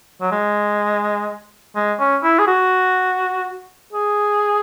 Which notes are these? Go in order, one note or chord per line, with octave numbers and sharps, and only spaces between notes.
F#3
G#3
G#3
C#4
E4
G#4
F#4
G#4